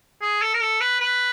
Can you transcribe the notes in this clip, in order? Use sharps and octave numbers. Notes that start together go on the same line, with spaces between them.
G#4
A4
A#4
A4
B4
B4